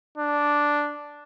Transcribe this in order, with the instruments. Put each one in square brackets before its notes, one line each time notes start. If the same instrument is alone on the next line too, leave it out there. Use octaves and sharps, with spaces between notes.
[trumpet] D4